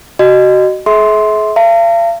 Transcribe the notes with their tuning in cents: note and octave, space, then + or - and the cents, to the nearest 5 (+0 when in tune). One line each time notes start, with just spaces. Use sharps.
F#4 +25 D#5 -20
G#4 +40 E5 -30 C6 +0
F5 -45 A5 +45